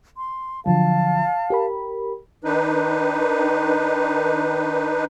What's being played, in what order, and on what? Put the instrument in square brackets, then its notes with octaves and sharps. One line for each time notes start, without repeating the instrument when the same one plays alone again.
[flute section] C6
[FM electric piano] D3 F3 F#3 [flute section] F5 A5
[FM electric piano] G4 A#4 B5
[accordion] D#3 D4 D#4 B4